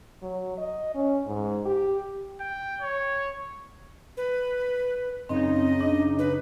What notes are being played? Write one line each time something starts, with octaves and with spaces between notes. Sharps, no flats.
F#3
D#5
C#4
G#2
G4
G5
C#5
B4
F#2 C#3 C4 D#4 D#5
D4
B4